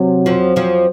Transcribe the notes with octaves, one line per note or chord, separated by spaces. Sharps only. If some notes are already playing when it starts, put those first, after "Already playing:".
Already playing: C3 F#3
F2 F3
F2 F3